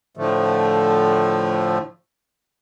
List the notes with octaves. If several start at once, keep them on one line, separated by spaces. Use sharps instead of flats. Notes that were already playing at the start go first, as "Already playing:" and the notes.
A2 D3 F3 A3